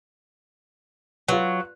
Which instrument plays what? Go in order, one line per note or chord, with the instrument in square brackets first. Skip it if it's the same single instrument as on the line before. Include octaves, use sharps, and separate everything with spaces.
[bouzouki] F#3 [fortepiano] F4 B4